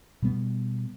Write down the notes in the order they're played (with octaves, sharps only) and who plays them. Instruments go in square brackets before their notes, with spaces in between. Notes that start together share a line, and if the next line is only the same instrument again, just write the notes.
[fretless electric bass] B2 G3 B3